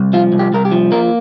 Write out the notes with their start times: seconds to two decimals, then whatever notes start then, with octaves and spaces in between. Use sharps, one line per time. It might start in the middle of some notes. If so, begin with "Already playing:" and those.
Already playing: C2
0.13 F3 F4
0.32 C2
0.39 G4
0.53 C2 A#4
0.65 G4
0.72 F3
0.92 A#3 A#4